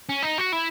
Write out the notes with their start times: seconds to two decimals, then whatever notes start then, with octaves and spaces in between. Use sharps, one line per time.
0.09 C#4
0.23 D#4
0.38 F#4
0.53 E4